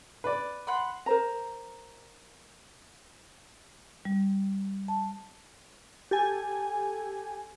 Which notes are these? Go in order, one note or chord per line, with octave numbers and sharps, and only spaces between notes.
B4 D5
F#5 B5 C6
A#4 C5 A#5
G3
A5
G4 A4 G#5